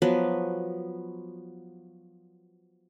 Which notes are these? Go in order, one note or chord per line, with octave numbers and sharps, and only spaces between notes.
F3 F#3 B3 B4